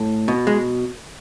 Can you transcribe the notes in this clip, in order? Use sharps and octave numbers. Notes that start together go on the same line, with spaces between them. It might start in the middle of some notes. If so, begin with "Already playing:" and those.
Already playing: A2
B2
G#3